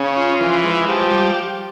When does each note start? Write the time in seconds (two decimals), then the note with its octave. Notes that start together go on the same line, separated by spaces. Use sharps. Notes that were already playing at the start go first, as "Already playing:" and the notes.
Already playing: C#3 C#4
0.17 F4
0.40 E3 F3
0.64 G#3
0.87 F3 G4
1.11 G3